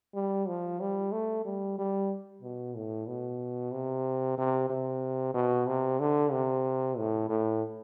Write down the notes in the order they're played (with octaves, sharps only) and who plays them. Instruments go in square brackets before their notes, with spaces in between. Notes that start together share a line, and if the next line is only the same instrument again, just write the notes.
[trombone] G3
F3
G3
A3
G3
G3
B2
A2
B2
C3
C3
C3
B2
C3
D3
C3
A2
A2